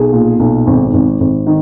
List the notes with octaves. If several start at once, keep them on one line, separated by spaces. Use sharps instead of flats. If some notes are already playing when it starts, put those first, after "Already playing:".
Already playing: B1 G#4
A#2
B1
G#1
G#1
G#1
D#3